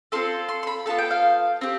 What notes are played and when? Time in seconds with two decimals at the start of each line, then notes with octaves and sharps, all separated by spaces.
0.12 C4 F4 A4 C6
0.49 C6
0.63 C6
0.67 B5
0.86 B3 F4 A4 A5
0.98 G5
1.11 F5
1.61 C4 G4